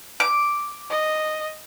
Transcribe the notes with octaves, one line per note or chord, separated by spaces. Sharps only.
D6
D#5